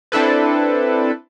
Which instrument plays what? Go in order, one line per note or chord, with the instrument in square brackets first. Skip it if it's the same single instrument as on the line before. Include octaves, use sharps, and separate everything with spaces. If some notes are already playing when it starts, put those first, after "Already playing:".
[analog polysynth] C4 D4 E4 A4 B4